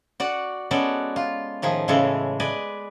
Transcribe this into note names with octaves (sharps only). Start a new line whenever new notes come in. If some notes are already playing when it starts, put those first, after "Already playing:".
F#4 D5 F#5
G#3 B3 C#4 F#4 A4 D5
F4
A2 D#3 F3 G#4
A2 C#3 E3 G#3 G#4 A4
B4 D5 D#5 G#5